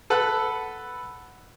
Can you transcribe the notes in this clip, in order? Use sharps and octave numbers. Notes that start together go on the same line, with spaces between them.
A4 B4 F#5 B5 F#6